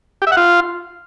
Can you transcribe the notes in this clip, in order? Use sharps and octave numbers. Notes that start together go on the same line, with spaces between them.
G4
E5
F#5
F4